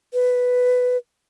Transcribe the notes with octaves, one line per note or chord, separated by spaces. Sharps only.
B4